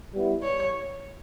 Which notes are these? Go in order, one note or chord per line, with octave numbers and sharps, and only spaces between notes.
G3 B3 E4
C#5